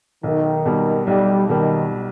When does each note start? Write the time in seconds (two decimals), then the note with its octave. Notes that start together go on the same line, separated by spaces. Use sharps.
0.23 B1 D#3
0.66 B2 G3
1.07 B1 G3
1.49 B2 D#3 G3